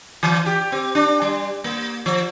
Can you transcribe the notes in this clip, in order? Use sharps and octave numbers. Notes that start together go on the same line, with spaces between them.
E3
G4
C4
D4
G3
A#3
F3